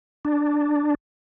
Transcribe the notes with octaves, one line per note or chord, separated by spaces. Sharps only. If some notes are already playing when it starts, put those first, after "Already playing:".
D4